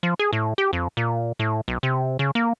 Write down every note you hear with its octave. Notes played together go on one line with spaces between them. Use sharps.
F3
G#4
A2
G4
F2
A#2
A2
B1
C3
C#3
A#3